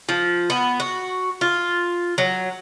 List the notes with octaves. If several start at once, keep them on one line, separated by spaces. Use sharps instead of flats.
F3
B3
F#4
F4
F#3